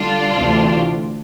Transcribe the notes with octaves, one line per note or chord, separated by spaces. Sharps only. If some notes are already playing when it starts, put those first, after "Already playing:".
Already playing: D3 G3 D4 F4
D2 C3 E3